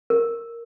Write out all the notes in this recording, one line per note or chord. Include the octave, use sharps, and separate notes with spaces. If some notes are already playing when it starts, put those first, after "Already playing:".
A#4